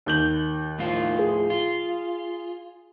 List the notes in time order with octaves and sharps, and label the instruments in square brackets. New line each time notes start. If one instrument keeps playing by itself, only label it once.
[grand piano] D#2 G6 F#7
[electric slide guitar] A2 F3 F4
[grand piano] G#4
[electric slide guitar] F4